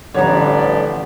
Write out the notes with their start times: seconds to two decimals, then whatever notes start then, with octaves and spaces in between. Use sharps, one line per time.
0.14 A1 D3 F3 G3 B3 D4 C#5 A#5